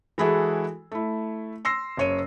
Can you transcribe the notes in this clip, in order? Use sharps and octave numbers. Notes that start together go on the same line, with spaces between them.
E3 G#3 E4 F#4 G#4 A4
A3 E4
C6 E6 A#6 C7
F#1 C#5 D#7